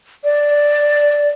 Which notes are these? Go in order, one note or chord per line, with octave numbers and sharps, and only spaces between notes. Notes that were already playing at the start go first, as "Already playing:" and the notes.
D5